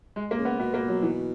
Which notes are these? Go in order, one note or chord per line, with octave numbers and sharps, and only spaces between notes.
G#3
A#3
C#3
B3
B2 B3
A#3
F#3
E3